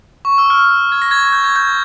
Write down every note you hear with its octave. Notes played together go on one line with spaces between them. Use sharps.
C#6
E6
F6
G#6
A#6
G#6
G6
G#6
G6